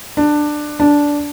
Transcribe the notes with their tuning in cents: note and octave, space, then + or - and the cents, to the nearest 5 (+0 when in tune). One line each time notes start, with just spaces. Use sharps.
D4 +15
D4 -10